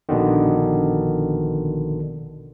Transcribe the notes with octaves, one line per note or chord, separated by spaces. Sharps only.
A#1 B2 D3 D#3